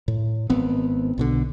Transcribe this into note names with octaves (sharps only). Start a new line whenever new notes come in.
A2
G#1 B3 C4
B1 B2 D3